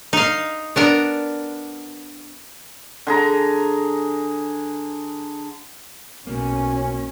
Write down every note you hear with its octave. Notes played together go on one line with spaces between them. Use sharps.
D#4 F5
B3 D4 A#4
D3 G#4 A#5
B1 B2 A#3 C#4